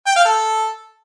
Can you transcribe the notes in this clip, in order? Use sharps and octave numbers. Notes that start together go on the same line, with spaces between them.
G5
F5
A4